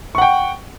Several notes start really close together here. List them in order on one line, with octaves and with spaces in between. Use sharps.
C#6 F#5 G5